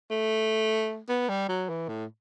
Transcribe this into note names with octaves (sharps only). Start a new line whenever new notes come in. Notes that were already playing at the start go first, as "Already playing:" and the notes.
A3
B3
G3
F#3
E3
A2